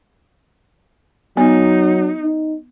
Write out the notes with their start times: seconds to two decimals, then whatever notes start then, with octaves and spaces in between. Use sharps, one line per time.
1.37 F#3 B3 D#4
2.22 D#4